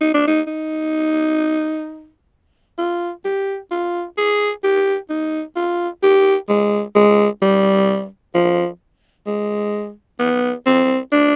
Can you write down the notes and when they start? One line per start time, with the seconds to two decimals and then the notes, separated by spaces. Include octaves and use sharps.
0.01 D#4
0.14 D4
0.27 D#4
0.47 D#4
2.78 F4
3.25 G4
3.71 F4
4.18 G#4
4.64 G4
5.10 D#4
5.56 F4
6.03 G4
6.49 G#3
6.95 G#3
7.42 G3
8.34 F3
9.27 G#3
10.19 B3
10.66 C4
11.12 D4